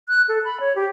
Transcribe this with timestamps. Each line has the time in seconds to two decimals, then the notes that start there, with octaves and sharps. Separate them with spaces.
0.09 F#6
0.29 A4
0.45 B5
0.60 C#5
0.76 G4